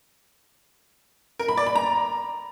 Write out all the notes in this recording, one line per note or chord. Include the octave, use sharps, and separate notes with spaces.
A#4
B5
D5
B5
A#5